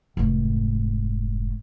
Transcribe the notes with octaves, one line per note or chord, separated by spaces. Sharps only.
F1 G#2